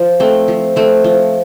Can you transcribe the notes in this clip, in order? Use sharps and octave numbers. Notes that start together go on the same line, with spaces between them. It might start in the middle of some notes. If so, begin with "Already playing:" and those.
Already playing: F3
A3 C4
F3
A3 C4
F3